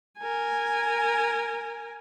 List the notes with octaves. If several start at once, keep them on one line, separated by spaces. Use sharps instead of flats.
A#4 G#5